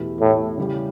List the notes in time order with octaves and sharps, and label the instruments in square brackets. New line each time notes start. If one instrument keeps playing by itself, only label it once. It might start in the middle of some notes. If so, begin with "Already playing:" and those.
Already playing: [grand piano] E2 B2 A3 E4 G4
[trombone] A2
[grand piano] C#3 G3 C#4 E4 G4